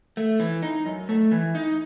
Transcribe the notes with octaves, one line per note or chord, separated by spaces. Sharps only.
A3
E3
D#4
F#2
A3
E3
D#4